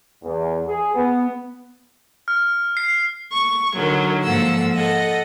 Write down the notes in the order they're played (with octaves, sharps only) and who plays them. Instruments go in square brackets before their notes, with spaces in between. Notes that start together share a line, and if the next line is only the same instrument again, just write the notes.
[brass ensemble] E2
G#4
B3
[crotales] F6
C7
[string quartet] C#6
D3 D#3 F#3
G#2 F3 A#3 A4 F#5 E6
A4 D#5 F#5